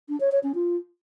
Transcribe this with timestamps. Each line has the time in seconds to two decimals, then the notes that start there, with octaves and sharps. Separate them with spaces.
0.09 D4
0.20 C#5
0.32 C#5
0.43 C#4
0.55 F4